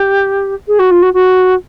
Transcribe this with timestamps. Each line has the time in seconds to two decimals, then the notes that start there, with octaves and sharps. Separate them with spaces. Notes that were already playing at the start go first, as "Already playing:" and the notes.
Already playing: G4
0.68 G#4
0.79 F#4
0.91 F4
1.02 F#4
1.13 F#4